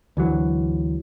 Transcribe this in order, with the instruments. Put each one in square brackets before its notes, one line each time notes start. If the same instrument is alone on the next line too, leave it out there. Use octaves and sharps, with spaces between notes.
[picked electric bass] D2 E3 F#3